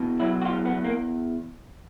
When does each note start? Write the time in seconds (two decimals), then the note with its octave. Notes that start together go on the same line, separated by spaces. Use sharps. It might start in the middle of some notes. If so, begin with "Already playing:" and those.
Already playing: E2 B2
0.20 F#3 E4
0.42 F#4
0.45 E2 F4
0.65 B3
0.72 E2
0.84 A#3